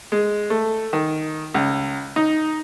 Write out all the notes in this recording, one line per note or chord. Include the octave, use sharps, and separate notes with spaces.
G#3
A3
D#3
C#2
D#4